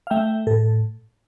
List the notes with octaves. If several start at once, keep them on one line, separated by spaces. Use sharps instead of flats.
F5
A3 E5 G5
A2 A4